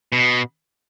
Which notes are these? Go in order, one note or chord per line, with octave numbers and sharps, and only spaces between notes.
B2